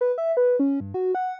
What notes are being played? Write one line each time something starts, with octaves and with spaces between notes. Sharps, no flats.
B4
E5
B4
C#4
G2
F#4
F#5